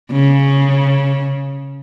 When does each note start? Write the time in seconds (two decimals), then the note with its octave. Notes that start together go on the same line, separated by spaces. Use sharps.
0.11 C#3